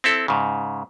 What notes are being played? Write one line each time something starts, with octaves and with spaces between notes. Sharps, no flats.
C4 E4 A4
G#2 C#3